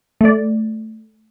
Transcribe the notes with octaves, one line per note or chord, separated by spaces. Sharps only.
A3 D5